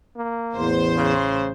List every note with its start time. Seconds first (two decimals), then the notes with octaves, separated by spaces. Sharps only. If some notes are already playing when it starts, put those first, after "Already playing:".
0.16 A#3
0.54 A1 E2 C5
0.96 C#3